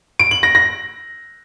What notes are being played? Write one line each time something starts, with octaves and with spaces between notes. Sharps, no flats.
D7
F#7
A#6
A#6